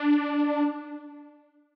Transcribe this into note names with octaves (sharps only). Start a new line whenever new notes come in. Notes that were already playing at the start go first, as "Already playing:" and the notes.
Already playing: D4